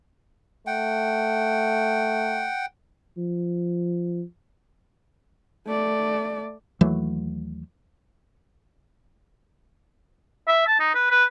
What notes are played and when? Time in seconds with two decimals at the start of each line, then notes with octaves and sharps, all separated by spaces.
0.67 A3 F#5 G5
3.17 F3
5.66 A3 D5
6.81 D#2 E3 F#3 A3
10.48 E5
10.67 A5
10.80 D#4
10.95 B4
11.11 B4